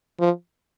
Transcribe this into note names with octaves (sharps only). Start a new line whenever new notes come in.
F3